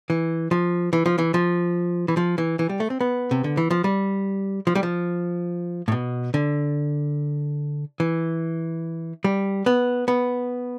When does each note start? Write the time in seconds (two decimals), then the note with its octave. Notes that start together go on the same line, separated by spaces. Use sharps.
0.10 E3
0.51 F3
0.93 E3
1.06 F3
1.18 E3
1.34 F3
2.08 E3
2.17 F3
2.38 E3
2.59 E3
2.69 G3
2.80 A3
2.90 C4
3.01 B3
3.31 C3
3.44 D3
3.57 E3
3.71 F3
3.84 G3
4.67 F3
4.75 G3
4.83 F3
5.88 A2
5.92 B2
6.34 D3
8.00 E3
9.24 G3
9.66 B3
10.08 B3